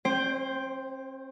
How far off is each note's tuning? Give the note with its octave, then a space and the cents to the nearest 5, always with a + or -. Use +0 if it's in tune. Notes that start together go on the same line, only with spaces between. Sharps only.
C4 +45 C5 +0 G5 +5